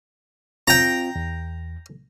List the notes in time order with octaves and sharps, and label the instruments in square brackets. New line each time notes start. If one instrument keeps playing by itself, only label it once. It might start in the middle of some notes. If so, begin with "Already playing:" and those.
[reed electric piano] C4 F4 [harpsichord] G5 A#5
[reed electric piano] E2